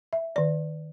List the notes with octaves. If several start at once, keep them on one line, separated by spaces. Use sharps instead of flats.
E5
D#3 D5